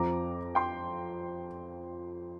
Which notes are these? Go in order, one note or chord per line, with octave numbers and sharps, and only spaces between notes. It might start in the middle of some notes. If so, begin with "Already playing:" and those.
Already playing: F2 F3 C4 A#5 D6
G5 C6